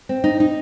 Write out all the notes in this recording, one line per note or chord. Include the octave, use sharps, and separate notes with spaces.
C4
D#4
D#4